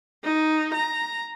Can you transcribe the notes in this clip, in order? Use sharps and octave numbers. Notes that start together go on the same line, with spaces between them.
D#4
A#5